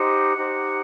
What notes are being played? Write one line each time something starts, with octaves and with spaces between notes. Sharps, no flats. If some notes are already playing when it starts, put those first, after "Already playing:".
Already playing: D#4 G4 C5 F#5
D#4 G4 C5